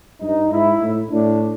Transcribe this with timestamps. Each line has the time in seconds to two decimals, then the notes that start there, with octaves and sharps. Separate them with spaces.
0.21 G2 D#4
0.51 G#2 E4
0.81 A2
1.10 A2 D4